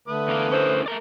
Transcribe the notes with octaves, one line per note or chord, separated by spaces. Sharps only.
D3 A3 B4 D#6
E2 A#3 F5
C#4 E4 A#4 C5
A3 A#4 D5